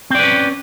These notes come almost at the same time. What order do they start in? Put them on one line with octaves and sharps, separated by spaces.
C4 D5 B4 C#4